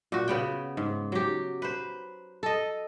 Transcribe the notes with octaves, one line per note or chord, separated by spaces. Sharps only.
A#2 F#4
C#3 B3 G5
G#2
F#3 G4
B4 C5
A4 D#5